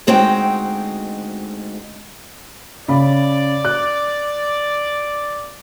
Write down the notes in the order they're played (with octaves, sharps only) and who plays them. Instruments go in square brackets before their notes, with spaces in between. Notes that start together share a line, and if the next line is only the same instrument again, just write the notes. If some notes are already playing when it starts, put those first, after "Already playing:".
[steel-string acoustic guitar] D2 G#3 C4 D#4 F#4 G5
[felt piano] C#3 B5 [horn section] D5
[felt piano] F#6